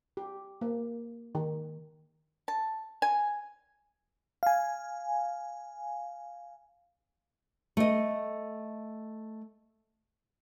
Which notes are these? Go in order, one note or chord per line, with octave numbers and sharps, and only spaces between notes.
G4
A#3
D#3
A5
G#5
F5 G#5
A3 D#5